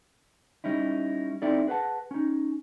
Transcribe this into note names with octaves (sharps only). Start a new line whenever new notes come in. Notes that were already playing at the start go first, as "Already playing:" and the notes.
G3 C#4 D#4 E4
C4 D#4 E4 A4 D5
G#4 B4 F#5 A5
C#4 D#4